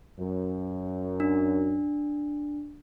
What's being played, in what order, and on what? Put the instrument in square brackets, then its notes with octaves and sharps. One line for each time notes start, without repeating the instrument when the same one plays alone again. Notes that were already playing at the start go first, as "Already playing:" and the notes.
[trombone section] F#2
[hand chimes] D4